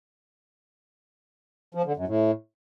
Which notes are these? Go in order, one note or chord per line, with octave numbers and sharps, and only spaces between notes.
F3
D3
F#2
A2